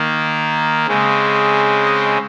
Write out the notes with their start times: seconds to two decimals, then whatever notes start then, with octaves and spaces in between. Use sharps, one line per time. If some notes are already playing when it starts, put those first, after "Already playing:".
Already playing: D#3 A#3
0.88 C#3 G#3 C4
1.85 D#5